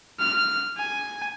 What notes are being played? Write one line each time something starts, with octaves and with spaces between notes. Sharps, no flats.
F6
G#5